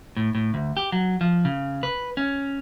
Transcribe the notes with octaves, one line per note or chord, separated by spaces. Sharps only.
A2
A2
D2
G4
F#3
F3
C#3
B4
C#4